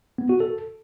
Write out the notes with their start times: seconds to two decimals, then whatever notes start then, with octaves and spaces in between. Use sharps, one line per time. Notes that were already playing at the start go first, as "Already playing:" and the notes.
0.18 B3
0.29 F#4
0.40 A4